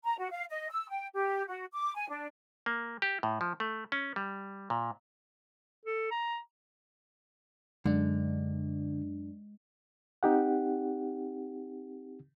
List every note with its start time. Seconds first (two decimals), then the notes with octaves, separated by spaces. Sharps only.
0.04 A#5
0.18 F#4
0.31 F5
0.50 D#5
0.70 E6
0.90 G5
1.14 G4
1.48 F#4
1.72 D6
1.96 G#5
2.09 D4
2.66 A#3
3.02 G4
3.23 A2
3.41 F3
3.60 A3
3.92 C#4
4.16 G3
4.70 A#2
5.85 A4
6.11 A#5
7.86 F#2 D3 G#3 D4
10.23 C4 D#4 G4 F#5